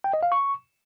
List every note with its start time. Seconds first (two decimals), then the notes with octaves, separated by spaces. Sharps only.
0.04 G5
0.13 D#5
0.23 F5
0.32 C#6